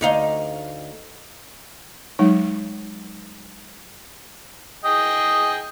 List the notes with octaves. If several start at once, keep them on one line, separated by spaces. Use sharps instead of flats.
D2 D#4 F5
F#3 G#3 D#4 C#5
G#4 D#5 G5